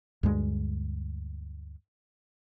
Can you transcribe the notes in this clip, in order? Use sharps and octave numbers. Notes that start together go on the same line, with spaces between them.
D2 G2 G#3